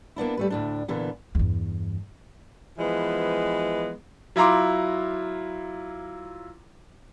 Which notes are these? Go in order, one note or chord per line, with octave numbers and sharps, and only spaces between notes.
A#3 B3 D4 E4
G3 A3 B4
D2 A2 D4
A#2 D3 E3 B3
E2 G2
E3 F3 G#3 B3
F#3 E4 F4 A#5 C6 D6